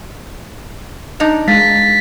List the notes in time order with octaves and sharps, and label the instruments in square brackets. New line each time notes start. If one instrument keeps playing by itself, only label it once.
[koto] D4 D#4 A#5
[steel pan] G#3 [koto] F4 [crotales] A6 B6